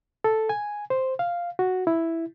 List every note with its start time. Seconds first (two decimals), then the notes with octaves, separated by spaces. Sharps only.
0.24 A4
0.49 G#5
0.90 C5
1.19 F5
1.59 F#4
1.87 E4